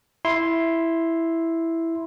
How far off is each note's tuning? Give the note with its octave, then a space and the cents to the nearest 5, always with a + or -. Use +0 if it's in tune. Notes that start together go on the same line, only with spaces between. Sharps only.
E4 +0 C6 +0